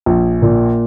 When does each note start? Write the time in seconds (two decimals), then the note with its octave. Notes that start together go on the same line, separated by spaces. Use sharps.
0.06 A#1
0.42 A#2